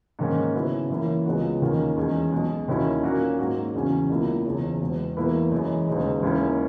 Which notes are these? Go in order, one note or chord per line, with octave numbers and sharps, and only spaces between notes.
G#2 D#3 A#3 C#4
C#3 F#3 B3 E4
F#2 E3 A#3 E4
C#2 C#3 G#3 B3 F#4
D#2 D#3 A#3 C#4
E2 B2 G#3 C#4 G#4
B1 B2 G#3
D#2 D#3 F#3 C#4 E4
A#2 A#3 C#4 F#4
G#2 F#3 A#3
E2 C#3 F#3 C#4
C#2 B2 A#3 E4
F#1 E2 C#3
E1 E2 B2
E2 B2 A#3 E4 B4
F#2 E3 G#3
E1 D#2 C#3 G#3
D#2 D#3 A#3 C#4 E4